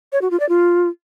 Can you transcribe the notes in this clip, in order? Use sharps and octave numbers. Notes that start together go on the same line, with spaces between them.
C#5
F#4
F4
D5
F4